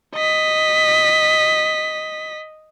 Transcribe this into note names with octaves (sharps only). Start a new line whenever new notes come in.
D#5 B6